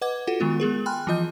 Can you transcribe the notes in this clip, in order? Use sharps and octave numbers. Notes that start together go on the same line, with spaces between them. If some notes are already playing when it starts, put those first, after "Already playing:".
B4 D#5 F#5 D6 G#6
F4 F#4 A4 F#5
D#3 G#3 B3 F4
G#3 B3 G#4 A#4
G5 G#5 B5 C6 F6 F#6
E3 F3 F4 D#5 G6